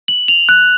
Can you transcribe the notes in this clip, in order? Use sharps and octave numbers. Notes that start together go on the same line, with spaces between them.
F#7
F7
F#6